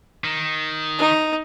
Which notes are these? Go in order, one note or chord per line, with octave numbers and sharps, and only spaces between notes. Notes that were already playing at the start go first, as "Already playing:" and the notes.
D#3
D#4